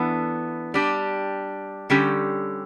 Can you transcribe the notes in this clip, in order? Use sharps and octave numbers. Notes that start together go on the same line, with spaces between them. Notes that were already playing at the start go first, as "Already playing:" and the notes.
Already playing: E3 B3 D4 A4
G3 D4 G4
D3 G3 C#4 G4